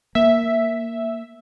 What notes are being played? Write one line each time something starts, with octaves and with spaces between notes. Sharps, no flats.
A#3 E5